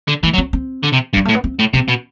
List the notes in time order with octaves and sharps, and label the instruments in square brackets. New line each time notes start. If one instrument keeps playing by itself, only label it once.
[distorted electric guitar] D3
[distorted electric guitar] E3 [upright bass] A3
[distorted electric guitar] F#3
[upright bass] C4
C4
[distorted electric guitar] D3
C3
G2
[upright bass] G3
[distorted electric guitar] A2 [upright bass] A3
[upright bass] B3
C4
[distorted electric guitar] A2
[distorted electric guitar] C3 [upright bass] C4
[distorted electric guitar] B2